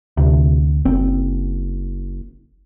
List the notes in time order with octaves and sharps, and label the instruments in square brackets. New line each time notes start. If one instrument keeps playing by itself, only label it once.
[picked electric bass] D2 [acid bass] C3
[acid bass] F#1 [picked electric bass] C4